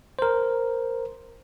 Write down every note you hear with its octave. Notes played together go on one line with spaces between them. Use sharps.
A#4 C5